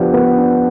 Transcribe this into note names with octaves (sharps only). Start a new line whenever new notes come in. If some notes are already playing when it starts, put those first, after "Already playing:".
Already playing: F3 B3 D4 G4
B3
D4